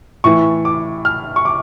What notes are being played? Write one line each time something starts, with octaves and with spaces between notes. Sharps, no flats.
A2 E3 C#6
D6
F6
C#6
D6